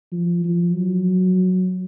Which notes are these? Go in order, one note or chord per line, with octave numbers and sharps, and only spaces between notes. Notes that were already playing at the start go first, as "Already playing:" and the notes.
F3
F3
F#3